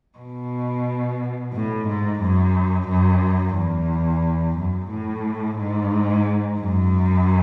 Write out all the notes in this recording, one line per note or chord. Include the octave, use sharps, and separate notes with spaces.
B2
A2
G#2
F#2
F#2
E2
F#2
A2
G#2
F#2